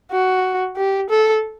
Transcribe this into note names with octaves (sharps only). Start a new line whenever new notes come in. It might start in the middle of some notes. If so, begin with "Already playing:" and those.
F#4
G4
A4